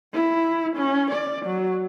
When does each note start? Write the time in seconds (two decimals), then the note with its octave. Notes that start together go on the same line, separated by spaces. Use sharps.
0.14 E4
0.77 C#4
1.11 D5
1.46 F#3